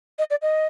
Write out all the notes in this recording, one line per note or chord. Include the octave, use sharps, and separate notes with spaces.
D#5
D5
D#5